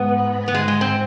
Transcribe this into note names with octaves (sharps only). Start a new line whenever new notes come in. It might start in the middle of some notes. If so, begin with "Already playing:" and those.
Already playing: G#2 B3
B3
G#2 G#3
G#3
C4